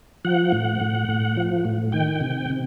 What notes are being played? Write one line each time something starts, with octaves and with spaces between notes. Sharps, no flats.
F3 F#5
A2
A2
A2
F3
A2
D#3 G5
C3
C3